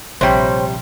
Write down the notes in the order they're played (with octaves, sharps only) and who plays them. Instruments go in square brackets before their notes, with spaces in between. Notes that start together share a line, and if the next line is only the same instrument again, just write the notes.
[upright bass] A#1 [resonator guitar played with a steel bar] C3 G3 [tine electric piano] C5 C#5 G5